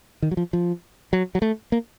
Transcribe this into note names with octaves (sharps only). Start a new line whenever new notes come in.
D#3
F#3
F3
F3
F#3
F#3
A3
A#3